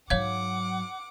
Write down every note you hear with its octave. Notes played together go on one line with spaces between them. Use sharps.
G#2 F#3 C#5 F5 F#5 D6 G#6